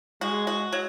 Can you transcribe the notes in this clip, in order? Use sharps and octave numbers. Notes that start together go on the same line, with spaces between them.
G#3 F#4
F#4
F#3